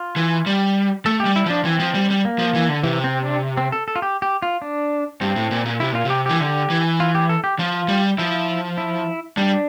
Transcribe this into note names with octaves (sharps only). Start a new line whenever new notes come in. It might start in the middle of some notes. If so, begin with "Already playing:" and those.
Already playing: F4
E3
G3
A3 A4
G4
G3
E4
F3 D4
E3 C4
F3
G3
G3
A#3
F3
E3
D3
C3 E3
C4
D4
C4
A4
A4
F4
G4
G4
F4
D4
G2 C4
A2
A#2
A#2
C3 E4
A#2 F4
C3 G4
E3 G4
D3 G4
E3
F4
G4
A4
G4
F3 F4
G3
F3 E4
E4
G3 D4